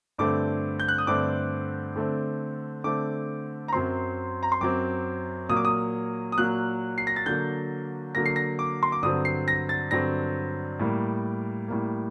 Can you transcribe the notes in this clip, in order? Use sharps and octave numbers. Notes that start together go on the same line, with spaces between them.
G2 D3 A3 C4 D6
G6
F#6
D#6
G2 D3 A3 C4 D6
D3 A3 C4
D3 A3 C4 D6
A#5
F#2 F#3 C4 C6
A#5
C6
F#2 F#3 C4 D6
A#2 F#3 A#3 D#6
D6
D#6
D#6
A#2 F#3 A#3 F#6
C7
A#6
A6
D3 F#3 A#3 G6
D3 F#3 A#3 A#6
C7
A#6
D6
C6
D6
G2 D3 F#3 C4 D#6
C7
A#6
A6
G2 D3 F#3 C4 A#6
A2 G3 A#3
A2 G3 A#3